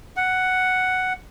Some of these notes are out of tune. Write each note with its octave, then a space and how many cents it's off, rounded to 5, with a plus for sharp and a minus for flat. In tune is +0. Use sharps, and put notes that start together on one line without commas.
F#5 +5